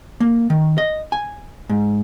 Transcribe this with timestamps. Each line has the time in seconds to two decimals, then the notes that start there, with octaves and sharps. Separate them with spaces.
0.20 A#3
0.50 D#3
0.78 D#5
1.12 G#5
1.70 G#2